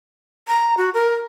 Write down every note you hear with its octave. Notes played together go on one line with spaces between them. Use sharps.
A#5
F#4
A#4